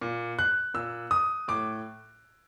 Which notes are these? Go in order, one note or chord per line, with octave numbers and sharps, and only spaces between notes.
A#2
F#6
A#2 E6
D#6
A2 D6